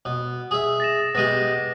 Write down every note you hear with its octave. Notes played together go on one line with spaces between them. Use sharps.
B2
G#4 E5
A6 A#6 E7
B2 G#3 G4 A#6 D#7